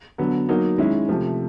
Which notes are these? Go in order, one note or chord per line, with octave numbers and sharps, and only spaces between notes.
D3 F#3 B3
F#3 A#3 D#4
D#3 G#3 C#4 E4
C3 F3 A3